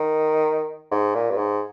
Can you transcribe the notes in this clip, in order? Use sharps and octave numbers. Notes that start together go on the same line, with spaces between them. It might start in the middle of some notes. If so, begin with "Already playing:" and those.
Already playing: D#3
G#2
A#2
G2
G#2